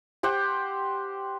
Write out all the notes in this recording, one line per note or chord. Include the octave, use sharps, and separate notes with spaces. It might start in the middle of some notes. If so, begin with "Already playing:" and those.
G4 C5 F#5 G5